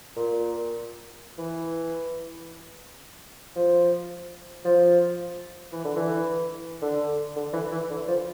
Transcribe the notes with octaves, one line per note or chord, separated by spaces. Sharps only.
A#2
E3
F3
F3
E3
D3
E3
D3
D3
E3
E3
D3
F3